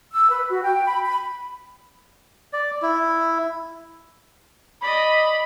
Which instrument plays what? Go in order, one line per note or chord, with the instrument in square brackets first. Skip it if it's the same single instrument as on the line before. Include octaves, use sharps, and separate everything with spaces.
[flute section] E6
B4
F#4
G5
B5
B5
[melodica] D5
E4
[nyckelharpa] D5 D#5 [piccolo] B5